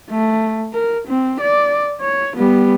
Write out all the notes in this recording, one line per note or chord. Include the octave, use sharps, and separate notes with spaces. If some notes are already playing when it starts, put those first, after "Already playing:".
A3
A#4
C4
D5
C#5
G3 B3